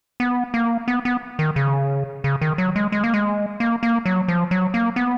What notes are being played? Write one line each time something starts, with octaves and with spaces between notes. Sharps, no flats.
B3
A#3
B3
B3
D#3
C#3
C#3
D#3
F#3
G#3
G#3
A#3
G#3
A#3
A#3
F#3
F3
F#3
A#3
B3